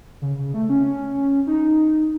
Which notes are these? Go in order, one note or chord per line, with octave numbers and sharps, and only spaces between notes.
C#3
C#3
A3
C#4
D#4